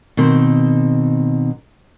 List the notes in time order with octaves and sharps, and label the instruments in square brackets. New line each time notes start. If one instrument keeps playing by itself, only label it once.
[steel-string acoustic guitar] B2 D#3 C4